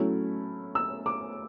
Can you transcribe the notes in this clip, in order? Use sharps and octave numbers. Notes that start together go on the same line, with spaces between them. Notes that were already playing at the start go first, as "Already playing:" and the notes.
Already playing: F#3 A3 C#4 E4
E6
D6